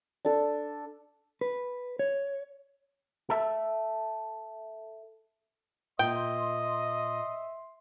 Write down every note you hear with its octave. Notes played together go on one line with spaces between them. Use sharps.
D4 A4
B4
C#5
A4 E5
A#2 D#5 E5 G5 C6